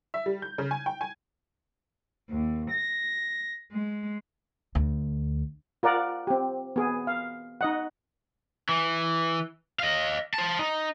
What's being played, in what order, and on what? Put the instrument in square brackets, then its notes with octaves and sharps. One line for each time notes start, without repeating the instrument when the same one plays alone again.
[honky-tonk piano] E5
G3
G6
C#3
G#5
G5
G#5
[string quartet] D#2
A#6
G#3
[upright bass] D2
[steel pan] F4 A#4 D5 F#5
C4 G4
B3 G#4
F5
D#4 D#5 F#5
[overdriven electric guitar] E3
D#5 F5
C5 A5
D#4